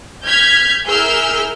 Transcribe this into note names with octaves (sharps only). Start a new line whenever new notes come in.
F6 G6 G#6 B6
E4 G#4 A#4 E6 F6 G6